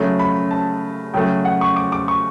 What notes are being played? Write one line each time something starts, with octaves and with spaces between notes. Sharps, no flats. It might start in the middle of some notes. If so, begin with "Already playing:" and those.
Already playing: C#3 F#3 A3
B5
A5
C#3 F#3 A3 G5
F#5
C#6
D6
D6
C#6